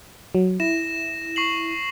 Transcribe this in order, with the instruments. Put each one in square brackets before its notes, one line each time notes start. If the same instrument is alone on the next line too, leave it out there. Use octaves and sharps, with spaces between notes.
[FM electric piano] F#3
[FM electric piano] E4 [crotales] A#6 E7
[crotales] C#6 C7 F#7